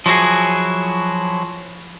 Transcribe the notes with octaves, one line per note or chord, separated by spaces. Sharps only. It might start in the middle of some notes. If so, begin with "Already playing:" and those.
F3 F#3 E4 F#4 G#4